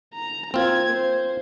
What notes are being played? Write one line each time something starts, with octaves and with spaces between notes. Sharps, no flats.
A#5
A#3 C4 F4 G#6
C5